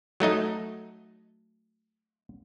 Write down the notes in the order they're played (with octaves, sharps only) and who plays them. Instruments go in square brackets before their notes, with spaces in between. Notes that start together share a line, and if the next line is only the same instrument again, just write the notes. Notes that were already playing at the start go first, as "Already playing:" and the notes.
[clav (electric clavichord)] F#3 A3 D#4 D#5